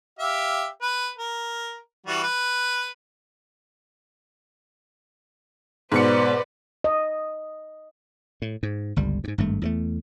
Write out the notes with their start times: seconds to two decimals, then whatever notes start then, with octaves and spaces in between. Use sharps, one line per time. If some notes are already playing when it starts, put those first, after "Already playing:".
0.19 G4 E5 F5
0.81 B4
1.18 A#4
2.07 E3 G3 F#4
2.23 B4
5.92 G#2 B2 B4 C5 D5 C#7
6.84 D#5
8.42 A2
8.63 G#2
8.96 G1 C#2 G3
9.24 F2 G#2
9.38 G#1 G2 A3
9.62 E2 F3 A3